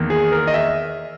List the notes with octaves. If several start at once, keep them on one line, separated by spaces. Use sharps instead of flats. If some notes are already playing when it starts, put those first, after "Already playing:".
Already playing: E2 D#3 A#3
G#4
A#4
D#5
E5